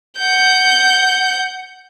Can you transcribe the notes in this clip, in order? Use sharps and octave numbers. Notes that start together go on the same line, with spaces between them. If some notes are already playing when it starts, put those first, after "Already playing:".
F#5 G6